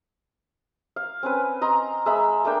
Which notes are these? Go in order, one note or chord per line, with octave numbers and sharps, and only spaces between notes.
F5
C4 C#4 B4
D#5 A#5 C6
G#3 E5 A#5 B5
A3 A#3 D4 G5